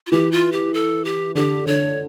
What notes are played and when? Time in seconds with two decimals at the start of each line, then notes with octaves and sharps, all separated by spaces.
0.07 F4
0.12 E3 G4
0.32 F4
0.52 G4
0.74 A4
1.05 G4
1.35 D3 G4
1.66 D3 C#5